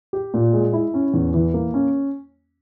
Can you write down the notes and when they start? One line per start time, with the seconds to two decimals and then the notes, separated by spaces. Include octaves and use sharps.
0.13 G4
0.34 A#2
0.53 G#3
0.73 E4
0.94 C#4
1.14 E2
1.34 E3
1.54 A#3
1.74 C#4